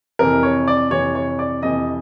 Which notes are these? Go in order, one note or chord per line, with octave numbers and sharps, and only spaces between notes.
F2 C3 E3 A#4
C#5
D5
F2 C3 E3 C#5
C#5
D5
F2 C3 E3 D#5